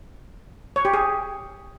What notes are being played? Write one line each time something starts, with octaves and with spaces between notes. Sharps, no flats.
C#5
G4
G#4